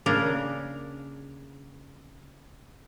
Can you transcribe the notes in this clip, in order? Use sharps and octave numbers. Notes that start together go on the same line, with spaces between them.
C#3 A#3 D4 G#4 A#4